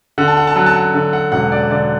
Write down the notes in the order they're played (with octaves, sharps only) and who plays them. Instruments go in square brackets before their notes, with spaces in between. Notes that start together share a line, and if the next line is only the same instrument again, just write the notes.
[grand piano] D3 F#5
A5
F#5
A5
F#3 F#5
A5
F#5
D3
F#5
E1 F#5
D5
D3 D5